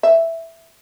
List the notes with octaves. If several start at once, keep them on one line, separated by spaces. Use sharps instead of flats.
E5